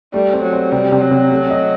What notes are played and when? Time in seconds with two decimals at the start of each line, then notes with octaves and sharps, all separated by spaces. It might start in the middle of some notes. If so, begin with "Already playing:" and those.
0.14 G3 A3
0.33 C4
0.43 F#3
0.53 C4
0.72 C3 G3
0.92 C3
1.01 F#3
1.11 C3
1.31 A3
1.50 D#5